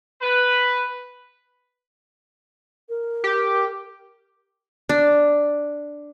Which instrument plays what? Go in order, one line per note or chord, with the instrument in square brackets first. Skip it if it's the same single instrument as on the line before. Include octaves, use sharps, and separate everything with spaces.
[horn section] B4
[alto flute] A#4
[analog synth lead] G4
[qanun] D4